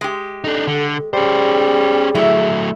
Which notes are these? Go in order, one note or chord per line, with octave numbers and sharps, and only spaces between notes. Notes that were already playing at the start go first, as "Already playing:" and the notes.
G#3 G4
D4 D#4 A4
D3
G3 C#4 G#4 C5
F#3 A3 E4